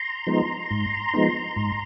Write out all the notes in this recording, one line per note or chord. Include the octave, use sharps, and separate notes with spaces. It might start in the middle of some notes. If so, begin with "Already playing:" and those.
Already playing: A#5 C6
F3 G#3 B3 D#4
G#2
F3 G#3 B3 D#4
G#2